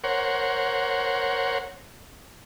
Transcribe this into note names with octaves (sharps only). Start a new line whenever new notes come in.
A#4 C5 C#5 F#5